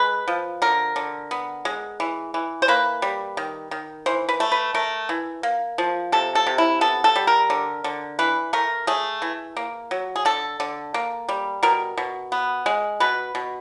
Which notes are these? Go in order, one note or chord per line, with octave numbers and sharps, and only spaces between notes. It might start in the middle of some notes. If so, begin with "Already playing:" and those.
Already playing: G#3 B4
F3
D3 A#4
D3
B3
G#3
E3
E3
C5
A#3 B4
G3
D#3
D#3
E3 C5
B4
A3
B4
A3 A#4
E3
A#3
F3
C3 A4
A4
C3
E4
B3 A4
A4
G3
A#4
D3
D3
E3 B4
A3 A#4
A3 G#4
E3
A#3
F#3
G#4
D3 A4
D3
A#3
G3
B2 A#4
B2
B3
G#3
B2 B4
B2